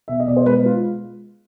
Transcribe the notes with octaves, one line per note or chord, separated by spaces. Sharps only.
B2 E5
D#5
B2 D5
C5
G#3 B4
F4